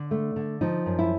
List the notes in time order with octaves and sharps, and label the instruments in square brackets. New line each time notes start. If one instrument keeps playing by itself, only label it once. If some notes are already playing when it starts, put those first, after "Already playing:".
Already playing: [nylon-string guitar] D3
A3
D3
F3 D#4
F#2
E4